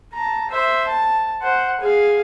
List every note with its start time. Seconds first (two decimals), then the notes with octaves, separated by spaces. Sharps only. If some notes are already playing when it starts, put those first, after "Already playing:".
0.13 A5 A#5
0.49 C5 E5
0.87 A5
1.42 C5 F#5
1.80 G#4 F5